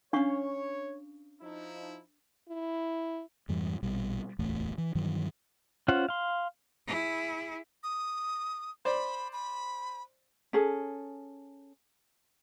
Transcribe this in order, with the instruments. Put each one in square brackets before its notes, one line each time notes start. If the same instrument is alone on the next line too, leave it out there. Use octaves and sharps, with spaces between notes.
[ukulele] C#4 F5 [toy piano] D4 C#6 [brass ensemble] C#5
[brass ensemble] F3 D#4 E4
[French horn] E4
[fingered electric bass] F2 G#2 E3 G3
A#1 B2 G3
D1 A1 E2 A3
E3
G2 D#3 E3 F#3
[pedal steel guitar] C#4 F4 C5 F#5
F5 C6
[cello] E4 G#4
[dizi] D#6
[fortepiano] C5 D5 [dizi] B5
[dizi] B5
[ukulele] C#4 G#4 A4